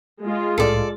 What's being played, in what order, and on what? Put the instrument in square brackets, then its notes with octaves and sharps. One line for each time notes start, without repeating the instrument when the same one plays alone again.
[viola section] G#3 F4
[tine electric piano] C2 A2 [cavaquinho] A4 D5